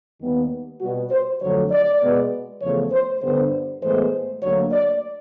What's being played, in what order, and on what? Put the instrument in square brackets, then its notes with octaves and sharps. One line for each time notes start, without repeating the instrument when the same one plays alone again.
[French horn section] D#2 D#3 G3 B3
B2 G3 B3 F#4
C5
F2 D3 F#3 A3 C#5
D5
B2 G#3 B3
E2 C#3 F3 A3 C#5
C5
G2 D3 G3 B3 C5
A2 E3 G#3 B3 C5
D2 D3 F#3 A#3 C#5
D5